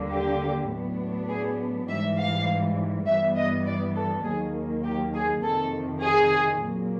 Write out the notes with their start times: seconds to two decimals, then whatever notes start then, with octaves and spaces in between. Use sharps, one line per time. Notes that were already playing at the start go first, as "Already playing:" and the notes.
Already playing: D#2 D3 G3 A#3
0.11 G4
0.70 A2 F#3 B3 D4
1.29 G#4
1.88 G#2 E3 G3 E5
2.18 F5
3.07 G2 E3 G3 B3 E5
3.36 D#5
3.66 D5
3.96 A4
4.24 D#2 D#3 F#3 A#3 G#4
4.84 G4
5.14 G#4
5.42 F2 C3 D#3 A4
6.02 G#4
6.61 A#2 F#3 A#3